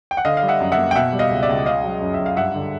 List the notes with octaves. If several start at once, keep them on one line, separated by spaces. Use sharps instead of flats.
G5
F#5
D3 D#5 F5
F5
G3
E5 F#5
F#2
E5 F#5
A#3
G5
B2 E5 F#5
G3
D#5 F5
C#2
D5 E5
C#2
C#3 D#5 F5
F#3
F#2
E5
F#2
F5
G2 E5 F#5
D3